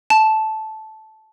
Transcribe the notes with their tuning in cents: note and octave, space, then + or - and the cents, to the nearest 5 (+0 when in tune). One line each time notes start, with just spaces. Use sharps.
A5 -10